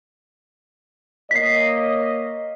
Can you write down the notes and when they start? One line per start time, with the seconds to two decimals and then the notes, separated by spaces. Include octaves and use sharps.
1.31 A#3 C#5 D#5 B6 C7